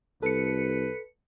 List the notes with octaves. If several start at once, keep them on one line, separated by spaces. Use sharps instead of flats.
C2 A4 B4 C#7